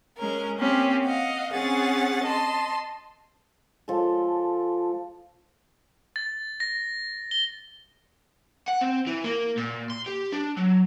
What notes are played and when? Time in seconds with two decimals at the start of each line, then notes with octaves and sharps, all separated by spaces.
0.17 G#3 C#4 A#4
0.58 A#3 C4 C#4 G4
1.04 D#5 F5 F#5
1.53 C4 C#4 G#4 F#5 A6
2.24 D#5 A5 C6
3.88 F3 G#3 A4
6.16 A6
6.60 A#6
7.31 G7
8.68 F#5
8.82 C4
9.07 E3
9.24 A#3
9.57 A#2
9.90 C6
10.06 G4
10.32 D4
10.57 F#3